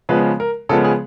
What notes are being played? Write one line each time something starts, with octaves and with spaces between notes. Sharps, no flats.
C#3 F3 G#3 B3 B4
A#4
C#3 F3 G#3 B3 A4
G#4